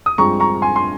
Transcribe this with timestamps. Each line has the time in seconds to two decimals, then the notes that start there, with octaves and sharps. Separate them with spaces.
0.06 D#6
0.18 G2 F3 G#3 C4 A#5 C#6
0.40 A#5 C#6
0.62 G#5 C6
0.76 C6